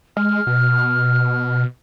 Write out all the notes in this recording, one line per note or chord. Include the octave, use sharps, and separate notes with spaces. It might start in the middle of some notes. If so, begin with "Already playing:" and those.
G#3 F6
B2